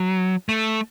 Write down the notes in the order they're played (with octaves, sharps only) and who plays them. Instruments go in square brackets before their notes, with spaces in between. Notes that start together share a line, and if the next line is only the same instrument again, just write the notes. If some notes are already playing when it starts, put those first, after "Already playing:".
Already playing: [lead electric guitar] F#3
A3